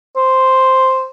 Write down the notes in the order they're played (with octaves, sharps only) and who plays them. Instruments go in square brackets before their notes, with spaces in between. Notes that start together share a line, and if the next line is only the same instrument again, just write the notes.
[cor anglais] C5